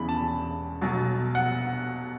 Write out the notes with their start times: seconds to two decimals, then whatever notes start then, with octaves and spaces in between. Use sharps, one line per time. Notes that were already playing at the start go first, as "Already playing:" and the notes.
Already playing: E1 E2 C#3 E3 B5
0.09 A5
0.81 B1 B2 F#3
1.35 F#5